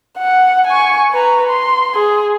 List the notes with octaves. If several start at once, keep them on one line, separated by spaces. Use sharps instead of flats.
F#5
G#5 C#6
B4 A#5
C6
G#4